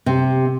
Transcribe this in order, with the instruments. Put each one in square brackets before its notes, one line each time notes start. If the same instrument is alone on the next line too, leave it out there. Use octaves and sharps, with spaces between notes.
[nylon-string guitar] C3